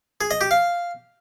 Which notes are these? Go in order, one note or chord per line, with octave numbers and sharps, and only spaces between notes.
G#4
D#5
G4
F5